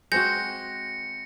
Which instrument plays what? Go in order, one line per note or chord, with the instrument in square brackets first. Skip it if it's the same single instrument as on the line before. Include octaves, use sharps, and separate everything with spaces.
[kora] G#3 C4 F#4 [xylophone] G6 [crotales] A#6 C#7